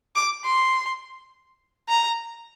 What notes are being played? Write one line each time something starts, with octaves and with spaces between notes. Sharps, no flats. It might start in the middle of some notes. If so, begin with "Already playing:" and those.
D6
C6
A#5